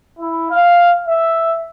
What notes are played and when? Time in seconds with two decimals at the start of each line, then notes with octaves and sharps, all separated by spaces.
0.19 E4
0.51 F5
1.06 E5